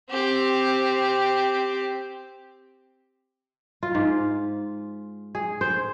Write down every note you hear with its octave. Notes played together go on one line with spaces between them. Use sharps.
C4 G4
F4
G#2
G#4
C5